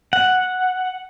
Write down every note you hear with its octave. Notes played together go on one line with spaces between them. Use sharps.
F#5